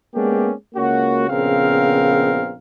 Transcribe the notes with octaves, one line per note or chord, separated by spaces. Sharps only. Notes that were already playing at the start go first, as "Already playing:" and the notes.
G#3 A#3 B3 C#4 D4 G4
C#2 A#3 C#4 F#4
A#1 C#3 B3 C4 A#4 F5